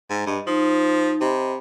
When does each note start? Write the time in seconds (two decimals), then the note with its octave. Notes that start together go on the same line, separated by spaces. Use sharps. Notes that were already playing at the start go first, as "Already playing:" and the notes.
0.10 G#2
0.27 G2 D#5
0.47 F3 D#4
1.21 C3 D#5 B5